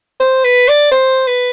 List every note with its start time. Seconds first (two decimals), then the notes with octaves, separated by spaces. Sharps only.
0.20 C5
0.44 B4
0.68 D5
0.92 C5
1.27 B4